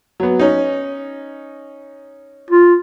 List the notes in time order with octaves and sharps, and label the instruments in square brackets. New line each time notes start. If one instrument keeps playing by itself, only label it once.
[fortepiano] F#3 B3
C#4 D#4
[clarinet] F4